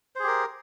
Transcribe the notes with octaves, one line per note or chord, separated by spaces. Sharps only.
G4 G#4 A#4 C5